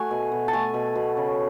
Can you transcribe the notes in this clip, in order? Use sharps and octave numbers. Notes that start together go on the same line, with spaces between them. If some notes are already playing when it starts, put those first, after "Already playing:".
Already playing: A3 F#4 F#5 G#5
B2
B2
A5
A3 G#5
B2
B2
C#3